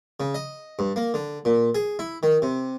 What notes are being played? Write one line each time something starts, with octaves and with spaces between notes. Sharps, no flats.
C#3
D#5
G2
A#3
D3
A#2
G#4
E4
D#3
C3